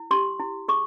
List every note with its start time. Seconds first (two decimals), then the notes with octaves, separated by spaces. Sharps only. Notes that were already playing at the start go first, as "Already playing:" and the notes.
Already playing: E4
0.11 G4 C6
0.40 E4
0.68 G#4 C#6